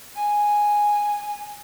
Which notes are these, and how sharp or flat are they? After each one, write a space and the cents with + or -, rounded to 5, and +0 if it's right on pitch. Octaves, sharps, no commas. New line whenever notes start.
G#5 -5